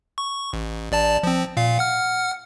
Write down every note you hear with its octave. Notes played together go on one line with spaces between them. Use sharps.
C#6
A1
A1 D5 A5
F3 C4
A#2 F5
F#5 F6